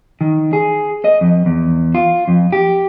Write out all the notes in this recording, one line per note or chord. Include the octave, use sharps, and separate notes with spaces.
D#3
G#4
D#5
F2
E2
F4
F2
G4